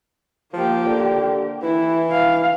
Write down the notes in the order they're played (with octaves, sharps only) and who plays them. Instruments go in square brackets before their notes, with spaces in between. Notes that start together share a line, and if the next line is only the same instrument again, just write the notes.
[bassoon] F3 [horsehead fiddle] A#3 G4
[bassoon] D3
[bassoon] E3 [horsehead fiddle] E4
[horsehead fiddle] F5